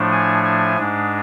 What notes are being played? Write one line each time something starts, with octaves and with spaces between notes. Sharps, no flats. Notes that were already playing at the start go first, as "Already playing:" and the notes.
Already playing: A2 F3 A3 D4
G#5
G#5
G#2 G#3 D4